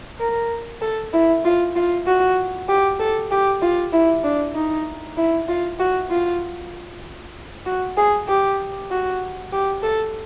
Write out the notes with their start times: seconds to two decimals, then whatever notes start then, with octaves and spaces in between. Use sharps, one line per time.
0.20 A#4
0.82 A4
1.13 E4
1.45 F4
1.75 F4
2.07 F#4
2.68 G4
3.00 A4
3.31 G4
3.62 F4
3.93 E4
4.24 D4
4.55 D#4
5.17 E4
5.48 F4
5.79 F#4
6.10 F4
7.66 F#4
7.97 G#4
8.28 G4
8.90 F#4
9.52 G4
9.83 A4